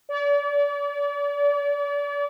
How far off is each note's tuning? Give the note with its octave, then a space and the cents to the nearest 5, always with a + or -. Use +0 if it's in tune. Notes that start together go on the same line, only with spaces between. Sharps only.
D5 -35